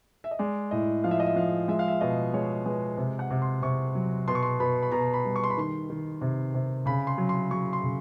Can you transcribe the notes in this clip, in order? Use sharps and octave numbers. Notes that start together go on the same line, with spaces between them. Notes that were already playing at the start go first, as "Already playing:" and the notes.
E5
D#5
G#3 D5
A2 D#5
F3 F5
E5
D#5
E5
F3 F5
G#3 E5
F5
E5
B2 D#5
G#3 C#5
G#3 B4
C3
F#5
C3
C6
C3 C#6
F#3
B2 C6
C#6
C6
B2 B5
B5
B2 A#5
B5
G3
C#6
C6
B5
D#3 C6
D#3
C3
C3
C#3 B5
C6
F#3
C6
F#3 C#6
C6
C#3